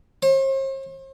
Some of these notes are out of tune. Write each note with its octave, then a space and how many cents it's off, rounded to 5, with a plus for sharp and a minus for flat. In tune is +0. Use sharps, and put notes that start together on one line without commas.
C5 +45